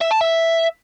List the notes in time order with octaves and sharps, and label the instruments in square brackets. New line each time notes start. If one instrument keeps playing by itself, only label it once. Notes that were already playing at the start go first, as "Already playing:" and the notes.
[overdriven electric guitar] E5
A5
E5